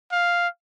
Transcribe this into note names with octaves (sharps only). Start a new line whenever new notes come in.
F5